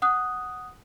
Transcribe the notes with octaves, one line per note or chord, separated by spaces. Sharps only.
F#5 D#6 F#6